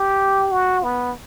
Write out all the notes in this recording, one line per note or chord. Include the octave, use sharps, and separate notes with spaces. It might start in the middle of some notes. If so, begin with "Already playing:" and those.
Already playing: G4
F#4
B3